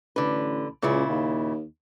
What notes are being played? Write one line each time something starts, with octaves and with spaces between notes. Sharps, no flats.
A1 D3 B4
C#2 A#2 C#3 E4
D#2